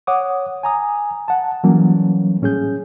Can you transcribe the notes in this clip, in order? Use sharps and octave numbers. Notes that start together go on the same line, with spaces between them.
C#5 F#5 D6 D#6
G#5 A#5 D#6
F#5 A5
E3 F#3 G3 A#3 C#4
A2 C#4 G#4 G6